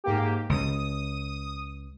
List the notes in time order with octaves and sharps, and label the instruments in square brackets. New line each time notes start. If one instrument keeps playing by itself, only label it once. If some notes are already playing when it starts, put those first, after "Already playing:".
[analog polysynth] G#2 A#3 G4
[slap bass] C#2 [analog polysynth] D#6